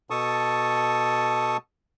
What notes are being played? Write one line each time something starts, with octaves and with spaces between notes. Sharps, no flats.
B2 A4 A5 C#6 D#6